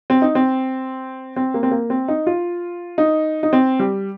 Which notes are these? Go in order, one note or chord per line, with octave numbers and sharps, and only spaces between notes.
C4
D#4
C4
C4
A#3
C4
A#3
C4
D#4
F4
D#4
D#4
C4
G3